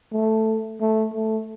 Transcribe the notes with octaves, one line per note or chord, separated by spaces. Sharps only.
A3
A3
A3